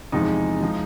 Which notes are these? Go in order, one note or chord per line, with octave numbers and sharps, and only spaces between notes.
E2 C3 F3 G#3 D#4
F3 G#3